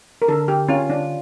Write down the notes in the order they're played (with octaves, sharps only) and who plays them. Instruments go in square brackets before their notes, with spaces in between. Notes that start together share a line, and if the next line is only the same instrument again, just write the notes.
[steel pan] A#4
[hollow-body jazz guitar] D3 [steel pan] A4
[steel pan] G4
[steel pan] C#4 [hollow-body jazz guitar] F4
[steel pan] D4